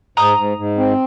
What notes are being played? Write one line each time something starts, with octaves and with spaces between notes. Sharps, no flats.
G#2 A#5 D#6
G#2
G#2
C4